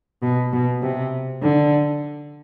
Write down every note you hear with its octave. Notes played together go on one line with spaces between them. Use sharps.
B2
B2
C3
D3